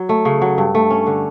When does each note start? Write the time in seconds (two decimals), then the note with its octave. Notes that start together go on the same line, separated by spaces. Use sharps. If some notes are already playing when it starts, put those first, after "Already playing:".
Already playing: F#3
0.09 A3
0.25 C#3
0.42 F#3
0.58 G2
0.75 A3
0.90 C#4
1.07 D3